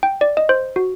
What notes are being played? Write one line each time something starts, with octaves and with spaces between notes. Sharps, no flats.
G5
D5
D#5
C5
F#4